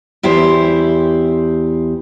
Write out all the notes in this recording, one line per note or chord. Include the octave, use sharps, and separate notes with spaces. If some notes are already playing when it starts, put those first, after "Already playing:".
E2 E4 G4 C5